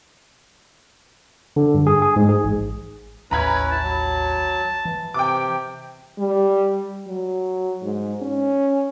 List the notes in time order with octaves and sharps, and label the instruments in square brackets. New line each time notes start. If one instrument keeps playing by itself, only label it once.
[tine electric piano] D3
G2
G#4
G#4
G#2
G#4
A1
[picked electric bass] A1 D#2 [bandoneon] C#4 E4 [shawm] B4 [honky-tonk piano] A#5 B5 G#6
[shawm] A5
[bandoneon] F#3
[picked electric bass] E3
[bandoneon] C3 [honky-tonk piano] G5 D6
[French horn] G3
F#3
G#2
C#4